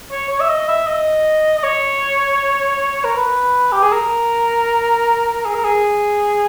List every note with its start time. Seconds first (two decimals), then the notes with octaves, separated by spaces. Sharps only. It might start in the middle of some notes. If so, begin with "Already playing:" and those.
0.11 C#5
0.30 C#5
0.40 E5
0.49 D#5
0.68 E5
0.87 D#5
1.58 D#5
1.63 C#5
3.04 A#4
3.17 B4
3.72 G4
3.82 G#4
3.93 A#4
5.45 G#4
5.55 A#4
5.64 G#4